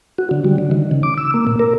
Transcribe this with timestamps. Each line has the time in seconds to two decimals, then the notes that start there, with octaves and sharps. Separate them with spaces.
0.18 F#4
0.31 D3
0.45 G3
0.58 D3
0.71 D#3
0.91 C#3
1.03 D6
1.18 E6
1.34 A#3
1.47 A#2
1.59 A#4